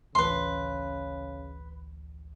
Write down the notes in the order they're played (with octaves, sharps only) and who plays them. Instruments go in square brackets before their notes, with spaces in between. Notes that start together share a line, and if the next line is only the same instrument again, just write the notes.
[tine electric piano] A1 D2 [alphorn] C#3 [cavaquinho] B4 C6